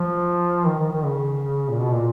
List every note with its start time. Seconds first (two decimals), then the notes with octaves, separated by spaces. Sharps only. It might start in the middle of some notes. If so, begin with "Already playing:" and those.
Already playing: F3
0.67 D#3
0.80 D#3
0.92 D#3
1.05 C#3
1.69 A#2
1.80 B2
1.93 A#2